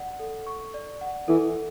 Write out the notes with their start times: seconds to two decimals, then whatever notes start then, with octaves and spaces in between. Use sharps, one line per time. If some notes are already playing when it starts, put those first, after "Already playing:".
Already playing: D5 F#5
0.19 A4
0.46 C#6
0.74 D5
1.01 F#5
1.28 E3 A4